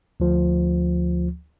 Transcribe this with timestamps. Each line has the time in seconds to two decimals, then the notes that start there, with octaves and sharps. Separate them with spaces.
0.20 D2 F3